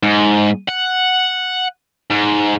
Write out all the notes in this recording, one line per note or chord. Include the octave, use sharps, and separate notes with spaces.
G#2
F#5
G#2